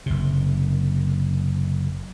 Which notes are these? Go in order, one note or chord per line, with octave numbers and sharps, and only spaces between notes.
F#1 C3